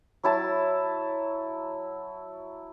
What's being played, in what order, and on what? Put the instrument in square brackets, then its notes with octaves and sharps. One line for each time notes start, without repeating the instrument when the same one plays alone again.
[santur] F#3 E4 A5